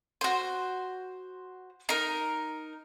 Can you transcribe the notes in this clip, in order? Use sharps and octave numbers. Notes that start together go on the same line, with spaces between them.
F#4 C5
D#4 A#4